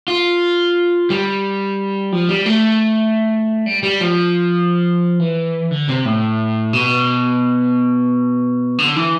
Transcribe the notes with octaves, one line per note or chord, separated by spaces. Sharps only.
F4
G3
F3
G3
A3
G3
G3
F3
E3
D3
C3
A2
B2
D3
E3